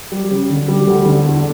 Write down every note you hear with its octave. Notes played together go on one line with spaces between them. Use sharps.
G3
C#3
D3
G3
D2
D3
E2